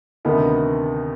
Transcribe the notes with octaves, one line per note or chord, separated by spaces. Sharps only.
D2 C3 D#3 B3 D#4